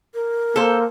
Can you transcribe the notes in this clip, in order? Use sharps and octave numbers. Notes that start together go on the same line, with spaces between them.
A#4
A#3 A4 C5